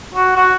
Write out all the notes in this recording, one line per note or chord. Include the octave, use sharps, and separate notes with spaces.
F#4
F#4